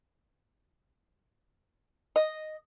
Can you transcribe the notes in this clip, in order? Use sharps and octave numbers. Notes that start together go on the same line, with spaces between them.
D#5